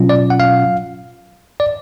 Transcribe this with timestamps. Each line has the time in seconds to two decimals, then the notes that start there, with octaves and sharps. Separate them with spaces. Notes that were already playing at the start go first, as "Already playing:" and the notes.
Already playing: B2 F#3 C#4 F4
0.09 D5
0.30 F#5
0.40 F5
1.60 D5